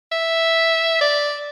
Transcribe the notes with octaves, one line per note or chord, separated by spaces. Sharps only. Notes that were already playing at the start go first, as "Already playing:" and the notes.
E5
D5